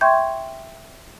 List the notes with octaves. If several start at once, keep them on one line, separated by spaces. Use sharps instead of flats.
E5 G5 C6 C#6 G6 G#6